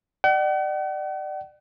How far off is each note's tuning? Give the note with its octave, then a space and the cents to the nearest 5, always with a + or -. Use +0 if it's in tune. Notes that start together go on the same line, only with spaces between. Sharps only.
D5 +35 F#5 +45